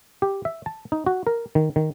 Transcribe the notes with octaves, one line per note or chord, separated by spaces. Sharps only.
G4
E5
A5
D#4
F#4
A#4
D#3
D#3